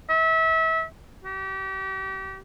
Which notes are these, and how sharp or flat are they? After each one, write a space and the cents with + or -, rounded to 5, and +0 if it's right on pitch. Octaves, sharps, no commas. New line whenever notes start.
E5 -30
G4 -35